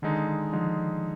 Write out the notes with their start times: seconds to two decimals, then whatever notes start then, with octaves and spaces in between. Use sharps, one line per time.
0.02 D3 D#3 G#3 D#4
0.53 D3 F3 G#3 D#4